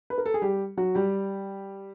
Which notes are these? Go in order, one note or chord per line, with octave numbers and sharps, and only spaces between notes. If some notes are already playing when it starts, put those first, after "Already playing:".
B4
A#4
A4
G#4
G3 G4
F#3 F#4
G3 G4